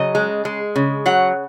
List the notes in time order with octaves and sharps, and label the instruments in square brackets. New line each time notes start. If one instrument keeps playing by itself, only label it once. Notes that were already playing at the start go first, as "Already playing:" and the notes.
Already playing: [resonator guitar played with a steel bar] C#3 F#3 D#5
G#3
G#3
C#3
F#3 F#5